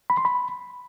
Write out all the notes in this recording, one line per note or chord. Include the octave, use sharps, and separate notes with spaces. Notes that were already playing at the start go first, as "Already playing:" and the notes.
B5
C6
B5